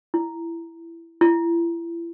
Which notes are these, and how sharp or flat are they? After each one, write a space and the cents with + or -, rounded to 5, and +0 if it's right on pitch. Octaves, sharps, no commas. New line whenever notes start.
E4 +15
E4 +35